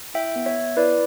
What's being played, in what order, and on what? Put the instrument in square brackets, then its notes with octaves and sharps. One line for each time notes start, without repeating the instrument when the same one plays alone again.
[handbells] E4 E5 G5
B3
C#5 E5
B3
E4 B4 D5